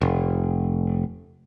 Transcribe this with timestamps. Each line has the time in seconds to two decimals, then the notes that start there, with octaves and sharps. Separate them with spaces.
0.01 F1